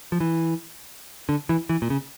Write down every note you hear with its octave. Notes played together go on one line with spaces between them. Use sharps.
F3
E3
D3
E3
E3
A#2
C#3